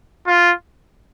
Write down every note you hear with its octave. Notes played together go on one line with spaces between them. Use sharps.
F4